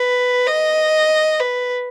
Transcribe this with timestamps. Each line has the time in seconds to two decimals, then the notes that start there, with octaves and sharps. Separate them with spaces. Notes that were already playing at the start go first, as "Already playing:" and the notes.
Already playing: B4
0.47 D#5
1.40 B4